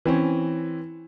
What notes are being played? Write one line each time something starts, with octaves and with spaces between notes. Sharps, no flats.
E3 C4 C#4